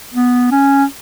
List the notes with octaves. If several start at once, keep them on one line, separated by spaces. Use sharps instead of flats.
B3
C#4